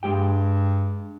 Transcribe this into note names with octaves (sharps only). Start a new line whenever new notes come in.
G2 G#3 G4 G5